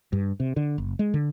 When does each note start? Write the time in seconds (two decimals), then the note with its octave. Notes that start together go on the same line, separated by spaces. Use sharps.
0.13 G2
0.40 C3
0.56 D3
0.78 F#1
0.99 G#3
1.14 D3